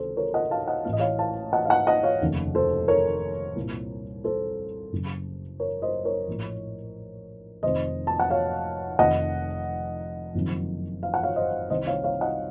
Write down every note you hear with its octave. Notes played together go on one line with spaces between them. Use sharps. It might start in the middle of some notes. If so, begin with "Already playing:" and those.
Already playing: C#2 C3 D#3 A4 C5
A#4 C#5
D#5 F#5
F5 A5
D#5 F#5
A1 A2 F5
D#5
C#5 F5
F5 A5
D#5 F#5
F5
D#5 F#5
D#5 F#5
C#5 F5
F1 D#2 C#3
A4 C5
A#4 C#5
C2 A#2
A4 C5
F#1 F#2 C#3
A#4 C#5
C5 D#5
A#4 C#5
A#1 A2
F1 F2 C3 D#3 C5 D#5
A5
F#5
C#5 F5
F1 F2 D#3 D#5 F#5
F#1 F2 C3 D#3
F5
F#5
C#5 F5
C5 D#5
C2 C3 D#3 C5 D#5
C#5 F5
C#5 F5
D#5 F#5